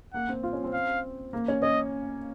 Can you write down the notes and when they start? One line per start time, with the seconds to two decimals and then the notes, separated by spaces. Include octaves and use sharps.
0.14 A#3 F#5
0.29 C4
0.43 F4
0.53 C#4
0.64 C4
0.73 F5
1.33 A#3
1.48 C#4
1.62 C#4 D#5